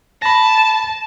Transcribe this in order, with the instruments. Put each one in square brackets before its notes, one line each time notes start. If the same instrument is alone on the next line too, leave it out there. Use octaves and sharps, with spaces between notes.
[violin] A5 [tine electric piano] B5 A#6